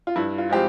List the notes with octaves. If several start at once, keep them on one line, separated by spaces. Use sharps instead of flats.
F4
G2 E4
F4
F3 G#3 C4 G4